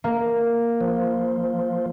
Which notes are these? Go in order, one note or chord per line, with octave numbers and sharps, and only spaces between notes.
A#3
F3